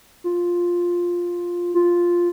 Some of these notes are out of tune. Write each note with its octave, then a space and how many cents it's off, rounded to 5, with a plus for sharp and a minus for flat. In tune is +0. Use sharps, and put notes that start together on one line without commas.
F4 +5
F4 +0